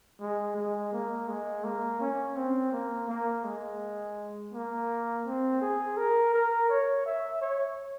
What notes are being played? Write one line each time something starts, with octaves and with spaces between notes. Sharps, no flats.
G#3
G#3
A#3
G#3
A#3
C#4
C4
A#3
A#3
G#3
A#3
C4
G#4
A#4
A#4
C#5
E5
C#5